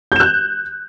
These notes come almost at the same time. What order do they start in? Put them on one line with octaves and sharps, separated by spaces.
G6 E7 F#6